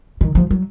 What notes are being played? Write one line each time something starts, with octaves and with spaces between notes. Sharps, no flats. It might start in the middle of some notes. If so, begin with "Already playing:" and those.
D#3
F3
F#3